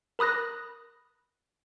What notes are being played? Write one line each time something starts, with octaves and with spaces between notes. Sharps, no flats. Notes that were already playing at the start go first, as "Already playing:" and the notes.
A#4 B5 D#6 F#6 A#6